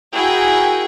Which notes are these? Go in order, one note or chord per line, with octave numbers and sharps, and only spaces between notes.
E4 F#4 G#4 A#4 G5 G#5